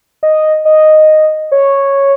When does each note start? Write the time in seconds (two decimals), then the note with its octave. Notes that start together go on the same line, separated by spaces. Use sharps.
0.23 D#5
0.65 D#5
1.52 C#5